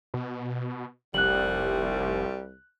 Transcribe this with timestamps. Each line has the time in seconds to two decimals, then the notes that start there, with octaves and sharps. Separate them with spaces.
0.14 B2
1.14 F1 C2 G3 F#6 F#7